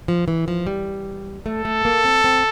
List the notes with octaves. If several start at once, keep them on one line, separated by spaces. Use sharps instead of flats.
F3
E3
F3
G3
A3 A4
A3
A#3
C4
C4